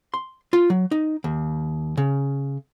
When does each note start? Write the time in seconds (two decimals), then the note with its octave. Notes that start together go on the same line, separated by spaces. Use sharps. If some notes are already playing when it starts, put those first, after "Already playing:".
0.14 C6
0.53 F4
0.70 F#3
0.91 D#4
1.24 D#2
1.97 C#3